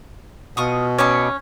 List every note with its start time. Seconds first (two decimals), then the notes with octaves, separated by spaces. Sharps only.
0.57 B2 F4 C#6 D#6
0.98 C#4 D#4 B4 D5